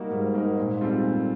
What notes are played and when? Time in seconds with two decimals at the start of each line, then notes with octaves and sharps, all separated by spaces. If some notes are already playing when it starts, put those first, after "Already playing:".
Already playing: G3 A#3 D#4 F#4 A#4
0.11 G#2 G3
0.34 A#3 D#4 F#4 A#4
0.58 A#2
0.81 G3 C4 F4 A4
1.04 A#2